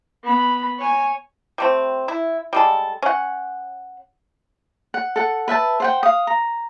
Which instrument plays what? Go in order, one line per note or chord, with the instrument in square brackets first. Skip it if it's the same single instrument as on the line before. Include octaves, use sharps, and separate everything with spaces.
[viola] B3 B5
C#5 G#5
[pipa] G3 A3 C4
E4
G3 G#3 A4
C#4 F#5
[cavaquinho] F#5
A4 F#5
B4 E5 F#5 A5
C5 F#5 G5
F5 D#6
A#5